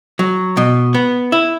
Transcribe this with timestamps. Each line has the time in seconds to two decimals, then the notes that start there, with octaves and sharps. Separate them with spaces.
0.19 F#3
0.57 B2
0.94 B3
1.32 E4